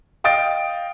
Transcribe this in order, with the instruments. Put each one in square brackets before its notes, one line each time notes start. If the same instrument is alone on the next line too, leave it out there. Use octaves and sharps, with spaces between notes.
[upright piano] D#5 F5 G5 D#6 A6 D7